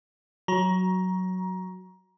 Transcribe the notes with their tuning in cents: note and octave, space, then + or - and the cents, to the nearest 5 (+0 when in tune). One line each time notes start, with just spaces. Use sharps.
F#3 +0 A#5 +20